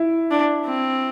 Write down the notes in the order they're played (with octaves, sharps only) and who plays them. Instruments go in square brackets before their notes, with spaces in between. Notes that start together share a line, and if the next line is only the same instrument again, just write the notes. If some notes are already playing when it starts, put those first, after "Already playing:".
Already playing: [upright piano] E4
[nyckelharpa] D4
C4